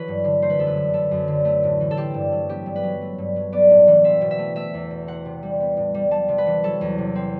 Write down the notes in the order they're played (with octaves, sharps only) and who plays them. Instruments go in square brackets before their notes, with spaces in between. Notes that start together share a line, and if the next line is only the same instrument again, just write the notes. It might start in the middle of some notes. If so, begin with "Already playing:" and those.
Already playing: [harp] E3 F#3 A3 B4
G2
D3
A3 C5
B4
F#2 A4
B4
D3
A3 A4
F#2
D3
A3
A2
E3
A4
C4 G4
G2
F#3
B3 G4
G2
B4
F#3
A3
G2
F#3
B3 D5
A2
E3
C4 E5
B2
E5
A3
A3 E5
E2
B2
C4 F#5
C3
G3
B3
A2
G3
G3 A5
C3
B4
E3
F#3 A4
E2
C3
C4